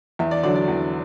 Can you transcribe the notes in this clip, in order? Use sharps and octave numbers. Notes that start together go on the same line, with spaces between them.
E2 E5
D5
D3 F#3 D5
D5
E2